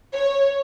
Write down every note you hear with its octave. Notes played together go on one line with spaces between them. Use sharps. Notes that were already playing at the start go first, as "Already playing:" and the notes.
C#5